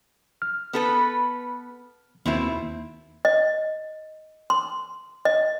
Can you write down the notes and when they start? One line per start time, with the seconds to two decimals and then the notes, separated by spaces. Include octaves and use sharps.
0.42 F6
0.73 B3 A4 B4
2.26 D#2 B2 C4 E4
3.25 D#5
4.50 C6
5.25 D#5